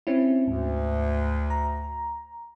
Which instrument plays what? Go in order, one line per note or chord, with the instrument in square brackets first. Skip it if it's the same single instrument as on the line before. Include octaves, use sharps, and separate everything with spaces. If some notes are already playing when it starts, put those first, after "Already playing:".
[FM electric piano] C4 C#4 E4
[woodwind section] D2 [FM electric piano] G#2
[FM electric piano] A#5